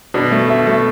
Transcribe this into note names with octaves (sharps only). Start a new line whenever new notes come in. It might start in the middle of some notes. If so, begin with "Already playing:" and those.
B2 D4
A3
B2 E5
A3